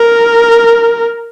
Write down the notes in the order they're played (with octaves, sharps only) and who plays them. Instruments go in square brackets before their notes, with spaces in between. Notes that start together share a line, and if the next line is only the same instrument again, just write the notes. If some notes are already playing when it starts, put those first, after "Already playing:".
Already playing: [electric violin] A#4